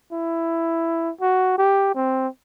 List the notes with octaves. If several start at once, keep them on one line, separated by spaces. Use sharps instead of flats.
E4
F#4
G4
C4